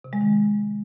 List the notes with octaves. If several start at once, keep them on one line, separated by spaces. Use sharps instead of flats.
C3
G#3
D#3